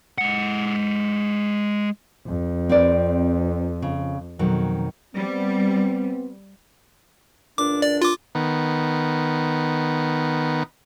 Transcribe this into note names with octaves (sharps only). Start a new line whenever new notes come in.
G#3 F#5
F2
C4 B4 D5
C#3
F2 B2 D#3 F#3
G3 B3 C4
C#2 A#2 D4 D6
D5
F4 D6
D#3 B3